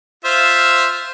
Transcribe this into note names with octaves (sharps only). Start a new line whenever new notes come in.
F4 C5 E5